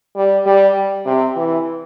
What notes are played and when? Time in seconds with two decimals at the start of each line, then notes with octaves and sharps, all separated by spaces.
0.16 G3
0.46 G3
1.06 C3
1.36 E3